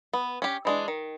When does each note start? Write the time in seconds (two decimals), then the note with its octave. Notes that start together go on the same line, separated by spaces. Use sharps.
0.14 B3
0.42 C#4 G4
0.65 E3 G#3 D4
0.88 D#3